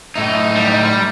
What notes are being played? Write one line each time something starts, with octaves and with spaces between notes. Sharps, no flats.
A2 D#4 E5
G3